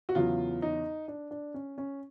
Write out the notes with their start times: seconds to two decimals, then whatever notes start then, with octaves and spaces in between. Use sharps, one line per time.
0.09 F#4
0.15 E2 C#3 F#3 F4
0.62 D#4
1.08 D4
1.31 D4
1.54 C#4
1.78 C#4